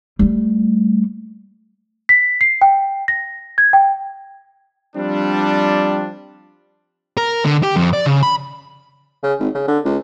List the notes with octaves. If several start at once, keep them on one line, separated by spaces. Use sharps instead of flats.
G3 A3
B6
C7
G5
A#6
G#6
G5
F3 G3 C4 D4
A#4
D3
G4
F2
D5
C#3
B5
C#3
G#1
C#3
D3
C#2